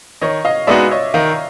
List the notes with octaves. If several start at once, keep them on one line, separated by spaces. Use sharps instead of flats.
D#3 C#5 D#5
D#5 F5
G#3 B3 D#4 F#4 D5 E5
C#5 D#5
D#3 D#5 F5